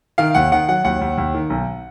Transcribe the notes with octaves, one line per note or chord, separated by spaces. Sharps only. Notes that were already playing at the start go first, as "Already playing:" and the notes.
D#3 F5
D#2 F#5
D#3 F#5
F#3 F#5
D#2 F#5
D#2
D#2
D#3
B1